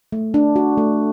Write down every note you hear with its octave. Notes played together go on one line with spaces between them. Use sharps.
A3
D4
F#4
A3